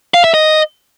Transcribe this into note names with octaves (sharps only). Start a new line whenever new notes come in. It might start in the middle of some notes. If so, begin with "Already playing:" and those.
F5
E5
D#5